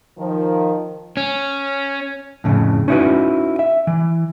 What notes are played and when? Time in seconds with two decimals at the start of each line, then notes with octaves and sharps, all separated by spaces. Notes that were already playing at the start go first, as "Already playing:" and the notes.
0.18 D#3 F3
1.17 C#4
2.44 F2 A2 C#3
2.88 C#4 D#4 E4 F#4 B4
3.59 E5
3.87 E3